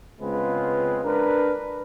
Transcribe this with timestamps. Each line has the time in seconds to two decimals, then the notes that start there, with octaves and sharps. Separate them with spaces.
0.21 C#3 G#3 B3 C4 F4 B4
1.04 D4 A#4 B4